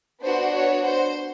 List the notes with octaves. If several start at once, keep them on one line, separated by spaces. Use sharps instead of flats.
B3 D4 F#4 C5
C#5
C5